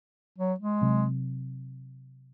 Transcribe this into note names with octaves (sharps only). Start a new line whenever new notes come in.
F#3
G#3
C3 F#3 C4